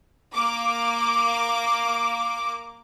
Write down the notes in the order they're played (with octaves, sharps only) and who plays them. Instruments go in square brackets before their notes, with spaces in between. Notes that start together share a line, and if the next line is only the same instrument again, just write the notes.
[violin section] A#3 D6